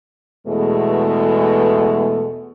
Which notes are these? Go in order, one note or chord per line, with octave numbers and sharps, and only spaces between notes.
E2 B2 G#3 A3 B3